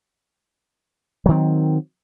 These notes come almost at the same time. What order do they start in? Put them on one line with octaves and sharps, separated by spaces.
F#3 D#3 C4